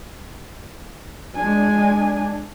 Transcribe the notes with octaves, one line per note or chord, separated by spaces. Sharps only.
G#3 D4 G#5